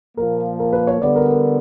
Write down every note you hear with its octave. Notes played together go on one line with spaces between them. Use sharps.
A#2 F3 A#3 A#4
A#4
B4
C#5
D3 G3 B3 D5
A#4
A#4